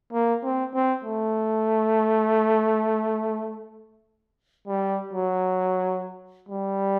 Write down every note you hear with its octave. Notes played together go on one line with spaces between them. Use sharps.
A#3
C4
C4
A3
G3
F#3
G3